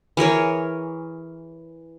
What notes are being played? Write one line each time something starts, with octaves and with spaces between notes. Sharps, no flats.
E3 G#4 A#4 C#5